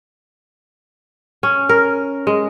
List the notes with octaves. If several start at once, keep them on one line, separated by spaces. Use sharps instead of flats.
C#4
A#4
G#3